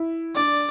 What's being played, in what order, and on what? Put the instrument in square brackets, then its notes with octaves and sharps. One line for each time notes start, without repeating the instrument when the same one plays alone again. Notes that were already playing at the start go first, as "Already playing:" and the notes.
Already playing: [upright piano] E4
[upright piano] D4 [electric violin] D5